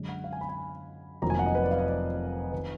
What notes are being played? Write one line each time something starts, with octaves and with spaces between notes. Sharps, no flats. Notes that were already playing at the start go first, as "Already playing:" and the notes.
Already playing: F#2 D3 G#3
F#5
F5
G#5
B5
G#5
F1 F2 D#3 F#3 A#3 A#5
G#5
F#5
D#5
B4
D5
F5
D#5
D5
D#3 B4